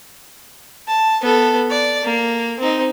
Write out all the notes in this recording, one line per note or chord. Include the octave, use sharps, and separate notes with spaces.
A5
B3 A4
D5
A#3
C4 D#4